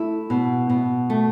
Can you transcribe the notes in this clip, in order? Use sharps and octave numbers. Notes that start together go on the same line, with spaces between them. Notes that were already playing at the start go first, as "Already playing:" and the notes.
Already playing: A3 E4
B2
B2
A3